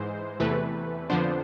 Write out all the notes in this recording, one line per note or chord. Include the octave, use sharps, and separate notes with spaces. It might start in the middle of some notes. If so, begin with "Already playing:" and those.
Already playing: G#2 E3 G#3 C5
E2 C3 E3 A3 B4
F2 D3 F3 B3 D4 C5